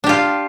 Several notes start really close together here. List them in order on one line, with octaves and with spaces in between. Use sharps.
D4 G4 F4